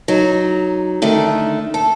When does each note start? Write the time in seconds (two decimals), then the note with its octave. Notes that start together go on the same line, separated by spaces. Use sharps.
0.08 F#3 D#4
1.02 D3 D#3 A3
1.74 A4